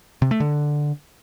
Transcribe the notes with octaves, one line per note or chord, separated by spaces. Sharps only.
C3
A3
D3